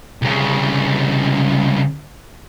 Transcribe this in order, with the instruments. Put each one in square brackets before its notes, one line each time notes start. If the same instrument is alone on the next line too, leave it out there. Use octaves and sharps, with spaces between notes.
[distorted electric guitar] C2 C#3